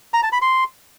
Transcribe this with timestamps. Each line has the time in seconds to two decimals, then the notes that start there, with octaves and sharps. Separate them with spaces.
0.14 A#5
0.23 A5
0.32 B5
0.42 C6